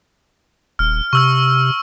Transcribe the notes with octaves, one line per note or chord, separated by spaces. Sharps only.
D#1 F6
C3 C#6 E6 F6